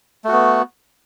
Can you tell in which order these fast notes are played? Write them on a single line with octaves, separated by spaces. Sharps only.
A3 F#4 B3